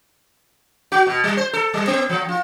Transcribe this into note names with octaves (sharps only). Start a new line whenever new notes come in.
F#4
B2
G3
C5
A4
G3
B3
F3
F4